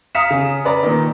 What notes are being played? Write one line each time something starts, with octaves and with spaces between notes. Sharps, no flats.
F5 A#5 D#6 B6 C#7 E7
C#3
B4 D5 A#5
A#2 D#3